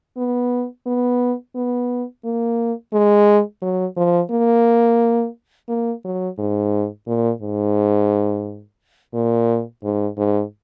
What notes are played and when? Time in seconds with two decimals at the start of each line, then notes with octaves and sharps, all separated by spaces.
0.17 B3
0.86 B3
1.55 B3
2.25 A#3
2.93 G#3
3.62 F#3
3.97 F3
4.31 A#3
5.69 A#3
6.04 F#3
6.38 G#2
7.07 A#2
7.42 G#2
9.14 A#2
9.84 G#2
10.18 G#2